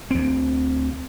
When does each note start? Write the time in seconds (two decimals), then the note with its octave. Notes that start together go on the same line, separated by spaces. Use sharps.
0.11 D2 C4